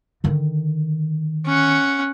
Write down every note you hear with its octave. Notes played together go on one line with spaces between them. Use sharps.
D3 D#3
C#4 F#5